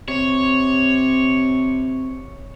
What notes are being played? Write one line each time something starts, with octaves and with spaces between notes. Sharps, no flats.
C3 C#5